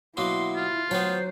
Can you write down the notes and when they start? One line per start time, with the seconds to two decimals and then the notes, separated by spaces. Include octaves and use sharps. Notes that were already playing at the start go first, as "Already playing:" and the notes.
0.17 B2 F#3 A#3 E4 C6
0.56 F4
0.91 F#3 B3 C5 C#5 G5